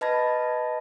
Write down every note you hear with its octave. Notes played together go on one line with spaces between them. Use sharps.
B4 D#5 A5 B5 G#6 A#6